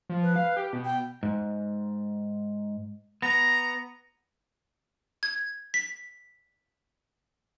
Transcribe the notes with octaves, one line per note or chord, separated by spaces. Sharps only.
F3
B4
F5
G4
B2
G5
G#2
B3 A#5
G#6
B6